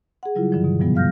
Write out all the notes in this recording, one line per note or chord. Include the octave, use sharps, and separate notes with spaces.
G#4 F#5
C#3 F#3 G3 E4 F4
G2 D3 E3 F3
B2
F#2 C3 F3 G3 B3
G#3 F5 F6 G6 A#6